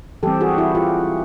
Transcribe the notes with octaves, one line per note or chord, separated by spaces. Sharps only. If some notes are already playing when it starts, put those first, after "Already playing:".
E3 G3 C4 G4 A4
F#4 G#4
E4 F#4
F4 G4